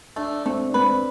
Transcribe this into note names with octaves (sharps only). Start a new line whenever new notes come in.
A3 D4
A3 C4
D4
C4 B4